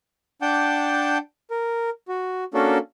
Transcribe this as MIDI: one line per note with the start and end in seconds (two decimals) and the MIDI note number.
0.42 1.18 62
0.42 1.18 78
0.42 1.18 79
0.42 1.18 81
0.42 1.18 86
0.42 1.18 91
1.51 1.90 70
2.08 2.44 66
2.54 2.78 58
2.54 2.78 61
2.54 2.78 62
2.54 2.78 66
2.54 2.78 69
2.54 2.78 70